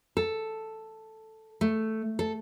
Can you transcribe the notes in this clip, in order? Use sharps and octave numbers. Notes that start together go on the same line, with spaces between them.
A4
A3
A4